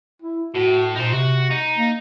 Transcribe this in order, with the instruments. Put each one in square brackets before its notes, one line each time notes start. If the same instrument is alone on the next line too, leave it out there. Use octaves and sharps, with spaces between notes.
[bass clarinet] E4
[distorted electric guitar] A2 [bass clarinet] F#4
[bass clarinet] A#2 [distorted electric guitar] D#4 C5
[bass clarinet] C3 [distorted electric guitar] F#4
[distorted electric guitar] D#4
[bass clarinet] A#3